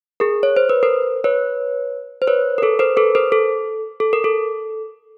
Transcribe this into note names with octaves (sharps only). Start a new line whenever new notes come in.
G#4 A#4
C#5
C5
B4
A#4 C5
B4 C#5
C5
B4 C#5
A#4
A4 B4
A#4 C5
A4 B4
A#4 C5
A4
A4
A#4
A4